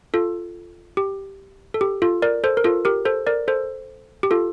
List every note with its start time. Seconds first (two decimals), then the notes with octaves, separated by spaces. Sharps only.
0.14 F4 A4
0.97 G4
1.74 A4
1.81 G4
2.02 F4 A4
2.22 A#4 D5
2.44 A4 C5
2.57 A#4
2.64 F4 A4
2.85 G4 A#4
3.05 A4 C5
3.27 A#4 D5
3.48 A4 C5
4.23 G4
4.31 F4 A4